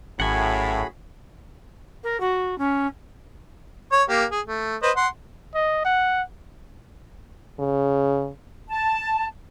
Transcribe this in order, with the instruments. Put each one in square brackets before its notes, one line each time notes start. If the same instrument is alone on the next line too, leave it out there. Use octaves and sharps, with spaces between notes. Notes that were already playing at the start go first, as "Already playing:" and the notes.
[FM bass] G#1 [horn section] F#2 A2 [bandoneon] F#4 G#4 B5 [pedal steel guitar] F#5 G#5
[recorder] A#4
F#4
C#4
[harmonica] C#5 C#6
A#3 G4
G#4
A3
B4 C5 D#5
F#5 C6
[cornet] D#5
F#5
[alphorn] C#3
[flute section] A5